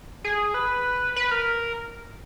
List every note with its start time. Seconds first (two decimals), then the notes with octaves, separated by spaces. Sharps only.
0.24 G#4
0.54 B4
1.16 B4
1.31 A#4